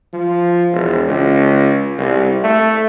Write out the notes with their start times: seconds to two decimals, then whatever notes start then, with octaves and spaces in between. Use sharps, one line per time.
0.13 F3
0.72 E1
1.07 C#2
1.99 C2
2.44 A3